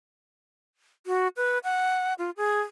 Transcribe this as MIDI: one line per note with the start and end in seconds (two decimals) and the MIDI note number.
1.06 1.28 66
1.37 1.58 71
1.64 2.14 78
2.18 2.30 65
2.37 2.61 68